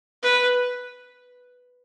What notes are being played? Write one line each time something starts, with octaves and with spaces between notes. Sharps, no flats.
B4